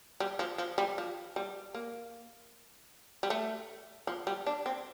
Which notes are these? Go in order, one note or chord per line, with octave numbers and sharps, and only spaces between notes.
G3
F3
F3
G3
F3
G3
A#3
G3
A3
F3
G3
D4
C4